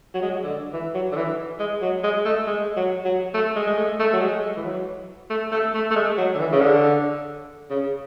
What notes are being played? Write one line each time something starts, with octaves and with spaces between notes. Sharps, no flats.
F#3
G#3
F#3
D3
E3
F#3
D3
E3
G#3
F#3
G#3
A3
G#3
F#3
F#3
A3
G#3
G#3
A3
A3
F#3
G#3
E3
F#3
A3
A3
A3
A3
G#3
F#3
D3
E3
C#3
D3
C#3